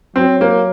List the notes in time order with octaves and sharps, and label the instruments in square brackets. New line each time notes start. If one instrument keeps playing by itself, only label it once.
[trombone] F#3 [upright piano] C4
[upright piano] A#3